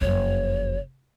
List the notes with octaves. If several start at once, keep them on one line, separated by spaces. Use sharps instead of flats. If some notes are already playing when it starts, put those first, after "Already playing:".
F#1 F2 C#5